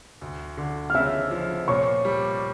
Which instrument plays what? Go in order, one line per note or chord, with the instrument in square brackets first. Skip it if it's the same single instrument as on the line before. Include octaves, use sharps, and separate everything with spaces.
[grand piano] D2
D3
[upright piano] F6
[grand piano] C#3 [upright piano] E5 E6
[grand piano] F3
[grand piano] A#2 [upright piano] C#5 C#6
[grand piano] G3